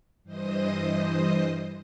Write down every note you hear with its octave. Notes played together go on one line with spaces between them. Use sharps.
G2 E3 C5 D#5 D#6